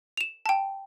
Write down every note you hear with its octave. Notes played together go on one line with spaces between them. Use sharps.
E7 F7
G5 A5